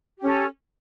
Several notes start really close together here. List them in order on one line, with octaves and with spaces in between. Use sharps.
G4 C#4 A4